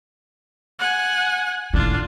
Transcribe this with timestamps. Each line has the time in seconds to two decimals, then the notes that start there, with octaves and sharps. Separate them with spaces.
0.79 F#5 G#5
1.74 A2 D#3 D4 F4